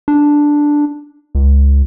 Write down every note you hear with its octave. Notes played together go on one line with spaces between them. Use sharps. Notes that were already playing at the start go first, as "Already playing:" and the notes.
D4
C#2